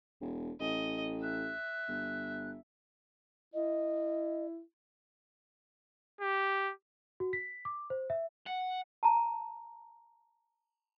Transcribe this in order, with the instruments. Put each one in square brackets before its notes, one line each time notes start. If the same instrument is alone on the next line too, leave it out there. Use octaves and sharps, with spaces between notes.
[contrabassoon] E1
[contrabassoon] A1 [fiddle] D#5
[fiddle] E5 [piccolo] F#6
[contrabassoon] G1
[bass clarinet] E4 [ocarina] D#5
[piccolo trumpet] G4
[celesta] F#4
B6
D6
C5
E5
[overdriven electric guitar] F#5
[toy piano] A5 A#5